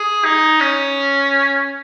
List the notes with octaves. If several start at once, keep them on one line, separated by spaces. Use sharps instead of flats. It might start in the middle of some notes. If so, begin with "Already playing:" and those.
Already playing: G#4
D#4
C#4